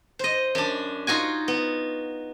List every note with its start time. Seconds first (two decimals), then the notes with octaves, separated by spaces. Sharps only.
0.19 C5 D#5
0.55 F#2 D4
1.07 D#4 F4 F#4 G#5
1.48 B3